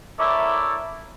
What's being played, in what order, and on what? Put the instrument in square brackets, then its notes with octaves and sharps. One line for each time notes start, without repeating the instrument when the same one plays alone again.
[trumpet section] E4 A4 A#4 C#5 D5 E5